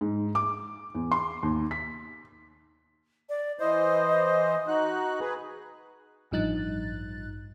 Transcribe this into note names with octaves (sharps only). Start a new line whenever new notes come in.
G#2
D6
E2
C6
D#2
B6
D5
E3 C5 D#5
D#4 F#4 F#6
G#4 B4
A1 G2 F3 D#4 F#6 A6